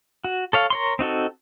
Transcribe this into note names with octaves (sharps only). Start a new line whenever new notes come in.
F#4
A4 C#5 F5
A#4 C#5 C6
C4 D#4 F#4 A4